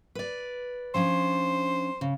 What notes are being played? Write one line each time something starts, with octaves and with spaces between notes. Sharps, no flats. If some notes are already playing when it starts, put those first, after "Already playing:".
B4 D5
F3 C#4 D4 C5
C#3